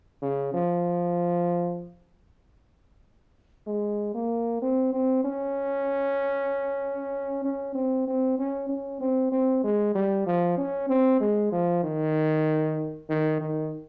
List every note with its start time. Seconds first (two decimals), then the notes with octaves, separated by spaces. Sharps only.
0.22 C#3
0.54 F3
3.67 G#3
4.14 A#3
4.62 C4
4.93 C4
5.24 C#4
7.45 C#4
7.75 C4
8.07 C4
8.39 C#4
8.69 C#4
9.01 C4
9.32 C4
9.64 G#3
9.95 G3
10.27 F3
10.58 C#4
10.89 C4
11.21 G#3
11.52 F3
11.84 D#3
13.10 D#3
13.41 D#3